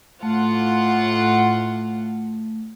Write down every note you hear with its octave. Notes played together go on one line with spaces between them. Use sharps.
A2 A3 F4 F#5